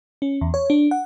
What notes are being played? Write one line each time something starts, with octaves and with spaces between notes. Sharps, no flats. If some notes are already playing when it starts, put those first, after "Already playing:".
C#4
E2
C#5
D4
F#5